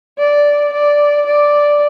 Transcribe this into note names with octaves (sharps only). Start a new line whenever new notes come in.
D5
D5
D5